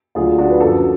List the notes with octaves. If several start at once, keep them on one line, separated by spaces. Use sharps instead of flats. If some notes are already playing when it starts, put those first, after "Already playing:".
D2 D3 F#3 F4 G#4
D4 F#4
B4
F#2 F3 F#4 A4